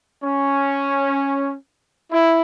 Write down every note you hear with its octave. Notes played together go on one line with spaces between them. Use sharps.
C#4
E4